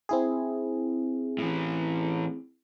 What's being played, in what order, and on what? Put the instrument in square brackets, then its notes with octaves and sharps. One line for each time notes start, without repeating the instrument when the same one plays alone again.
[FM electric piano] C4 E4 G#4
[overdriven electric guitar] A2 E3